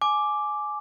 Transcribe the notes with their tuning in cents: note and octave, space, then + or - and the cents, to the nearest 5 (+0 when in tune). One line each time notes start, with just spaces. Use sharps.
G#5 +20 D6 +0